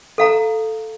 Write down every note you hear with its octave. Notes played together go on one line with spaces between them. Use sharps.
A4 F5 A#5